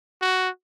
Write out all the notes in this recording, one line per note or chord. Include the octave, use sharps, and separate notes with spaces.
F#4